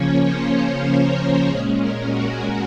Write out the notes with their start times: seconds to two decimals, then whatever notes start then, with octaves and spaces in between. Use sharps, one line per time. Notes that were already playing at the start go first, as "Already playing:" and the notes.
Already playing: C#3 F3 A#3 C#4 C#5
0.24 C5
0.56 C5
1.02 A#4
1.48 A#2 G#3 C#4 G#4
1.80 A#4
2.10 F#4